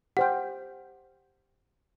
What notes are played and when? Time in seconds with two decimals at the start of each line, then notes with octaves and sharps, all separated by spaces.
0.17 G4 C5 F#5 G5 F6